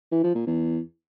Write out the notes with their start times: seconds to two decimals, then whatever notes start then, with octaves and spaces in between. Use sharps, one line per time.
0.12 E3
0.23 F3
0.35 A#2
0.47 E2